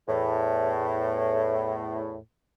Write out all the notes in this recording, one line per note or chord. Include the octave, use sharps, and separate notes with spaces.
E2 A2